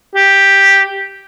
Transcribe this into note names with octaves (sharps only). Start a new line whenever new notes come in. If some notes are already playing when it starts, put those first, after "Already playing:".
G4